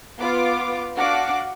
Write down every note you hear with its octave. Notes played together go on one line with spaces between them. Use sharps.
B3 F4 D6
D4 F#4 F5 F#5 D6